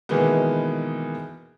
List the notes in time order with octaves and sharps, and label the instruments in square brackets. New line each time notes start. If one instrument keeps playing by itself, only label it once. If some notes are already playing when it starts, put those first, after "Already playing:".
[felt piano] B2 D#3 E3 G#3 A#3 B3